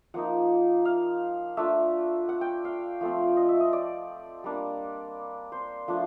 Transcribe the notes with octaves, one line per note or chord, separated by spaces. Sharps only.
F3 A#3 D#4 F#5
F5
A3 D4 F4 E5
F#5
G5
F5
F3 A3 C4
D#5
E5
D#5
D5
G3 A#3 D4
C5
F3 A3 D4